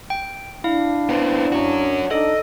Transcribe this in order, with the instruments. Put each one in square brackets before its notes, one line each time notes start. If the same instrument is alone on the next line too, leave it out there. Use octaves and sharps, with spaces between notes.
[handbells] G5
[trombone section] D4 [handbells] E4 F5
[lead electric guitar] B3 C4
C#4 F#4
[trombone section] D4 D#4 [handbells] A4 [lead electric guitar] D#5